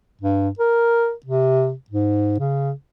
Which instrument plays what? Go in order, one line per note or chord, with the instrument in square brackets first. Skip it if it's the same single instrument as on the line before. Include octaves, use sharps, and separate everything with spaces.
[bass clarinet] G2
A#4
C3
G#2
C#3